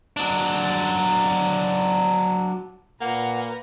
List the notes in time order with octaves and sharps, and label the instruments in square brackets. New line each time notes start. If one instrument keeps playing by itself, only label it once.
[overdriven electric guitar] F#3 D4
[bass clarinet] A#2 [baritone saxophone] A#3 [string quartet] B4 A#5 [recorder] F#5